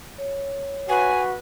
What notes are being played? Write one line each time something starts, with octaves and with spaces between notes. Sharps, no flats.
C#5
F#4 B4 G#5